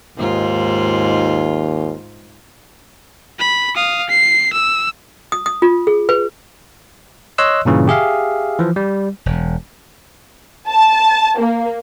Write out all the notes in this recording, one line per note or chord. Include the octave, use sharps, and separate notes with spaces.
D#2 G#2 F4
B5
F5 D#6
C7
E6
D#6
D#6
F4
G#4
B4
C#5 D#5 C6 E6 F#6
G2 A#2 C#3 E3
G4 G#4 E5 F5
E3 F3
G3
E1
A5
A#3